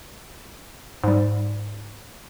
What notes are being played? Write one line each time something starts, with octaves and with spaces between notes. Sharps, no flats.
G#2 G3